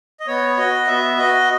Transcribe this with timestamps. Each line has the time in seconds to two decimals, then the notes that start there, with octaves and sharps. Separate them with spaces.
0.20 D#5
0.27 B3 C#5
0.57 F#4 D#5
0.87 B3 E5
1.18 F#4 D#5